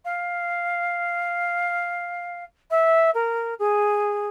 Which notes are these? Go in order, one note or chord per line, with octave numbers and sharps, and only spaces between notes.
F5
E5
A#4
G#4